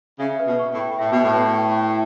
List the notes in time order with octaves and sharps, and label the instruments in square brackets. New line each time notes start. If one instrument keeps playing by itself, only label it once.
[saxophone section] C#3 [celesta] E5
[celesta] B4
[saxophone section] B2
[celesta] C#6
[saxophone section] A2
[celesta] G5
[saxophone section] A2 [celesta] E5
[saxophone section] B2
[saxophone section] A2 [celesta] B4
[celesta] C#6
G5
E5